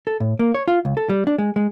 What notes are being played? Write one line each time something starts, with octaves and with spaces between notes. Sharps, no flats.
A4
A2
A#3
C#5
F4
C#2
A4
G3
D4
G#3
G#3